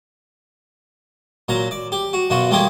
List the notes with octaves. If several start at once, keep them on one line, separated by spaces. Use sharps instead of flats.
A#2 F#3 A#5
D5
G4
F#4
F#2 B2 F4 F#4
G3 A3 A#3 F4 G4 G#4